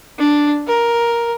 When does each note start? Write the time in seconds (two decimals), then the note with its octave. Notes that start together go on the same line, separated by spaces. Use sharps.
0.18 D4
0.67 A#4